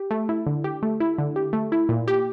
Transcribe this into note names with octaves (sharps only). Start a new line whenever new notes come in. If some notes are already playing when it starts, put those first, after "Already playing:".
Already playing: G4
A3
E4
D3
G4
A3
E4
D3
G4
A3
E4
A#2
G4